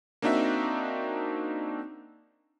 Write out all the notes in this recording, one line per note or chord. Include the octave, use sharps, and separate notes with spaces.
A#3 C4 D4 D#4 F#4 E5